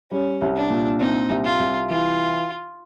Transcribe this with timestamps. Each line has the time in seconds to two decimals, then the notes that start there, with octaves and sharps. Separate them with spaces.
0.11 G3 C#4
0.41 C2
0.56 D4
0.70 A#2
1.00 C4 D#4
1.30 C2
1.45 F4
1.59 C2
1.89 E3 F4